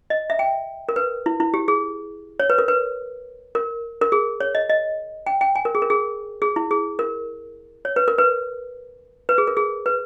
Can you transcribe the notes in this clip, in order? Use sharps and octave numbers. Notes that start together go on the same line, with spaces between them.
D#5
E5
G5
A#4
B4
E4
E4
G4
G#4
C#5
B4
A#4
B4
A#4
A#4
G#4
C#5
D#5
D#5
G5
G5
G#5
A#4
G#4
A#4
G#4
G#4
E4
G#4
A#4
C#5
B4
A#4
B4
B4
G#4
A#4
G#4
B4